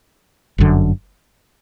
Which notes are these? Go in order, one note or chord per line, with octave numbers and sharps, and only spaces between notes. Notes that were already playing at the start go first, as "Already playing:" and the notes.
G1 F#2 D3